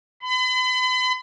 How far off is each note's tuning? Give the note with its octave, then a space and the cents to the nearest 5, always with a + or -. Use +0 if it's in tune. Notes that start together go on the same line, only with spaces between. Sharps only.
B5 +40